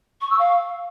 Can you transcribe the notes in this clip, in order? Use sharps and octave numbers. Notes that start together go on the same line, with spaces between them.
C#6
E6
F5